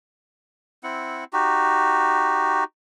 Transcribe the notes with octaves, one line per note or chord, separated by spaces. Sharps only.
C4 E4 F#5
D#4 F#4 G4